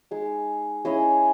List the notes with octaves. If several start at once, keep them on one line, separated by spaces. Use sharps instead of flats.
G#3 D#4 G#4
C#4 E4 G#4 D#5